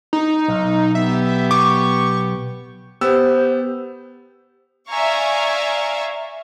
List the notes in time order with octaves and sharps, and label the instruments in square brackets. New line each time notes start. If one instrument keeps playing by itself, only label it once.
[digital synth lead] D#4
[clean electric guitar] B1
[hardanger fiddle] B3 G4 [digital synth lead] E5
[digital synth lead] C#6 [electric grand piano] D6
[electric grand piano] B3 E6 [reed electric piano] G4 [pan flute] C5
[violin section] D5 E5 F5 G#5 A#5 C#6